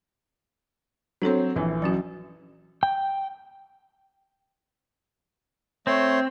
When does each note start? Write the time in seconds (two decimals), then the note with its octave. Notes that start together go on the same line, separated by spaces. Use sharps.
1.22 F#3 C4 D4 A4 C#5
1.56 A#1 E3
1.82 F#3 C#4 F#4
2.83 G5
5.87 A3 C4 C#5 C6